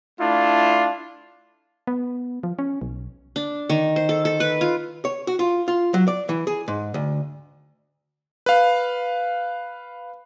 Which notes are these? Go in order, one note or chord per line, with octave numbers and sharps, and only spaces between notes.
A3 D4 E4 F4
B3
F3
C#4
B1
D4
D#3
C5
A4
A4
B4
F4
C#5
F#4
F4
F4
F#3
D5
E3
G#4
G#2
D2
B4 F5